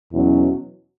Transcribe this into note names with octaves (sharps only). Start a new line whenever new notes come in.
E2 B2 F#3 C#4 E4